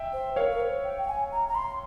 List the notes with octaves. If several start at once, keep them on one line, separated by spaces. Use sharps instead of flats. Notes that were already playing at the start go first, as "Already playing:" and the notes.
Already playing: E5 G5
C5
A#4 C#5 F5
A#4
C5
G5
G5
G#5
A#5
A#5
C6